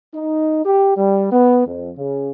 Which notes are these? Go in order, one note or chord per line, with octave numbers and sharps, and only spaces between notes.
D#4
G4
G3
B3
F2
C#3